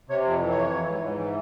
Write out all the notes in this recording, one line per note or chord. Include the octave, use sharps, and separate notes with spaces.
C3 C#5
F2
E3
F2 C#5
E3
G#2
G#2
E3